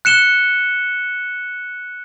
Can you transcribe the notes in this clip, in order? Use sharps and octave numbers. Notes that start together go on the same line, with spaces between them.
F#6 C#7 E7 G7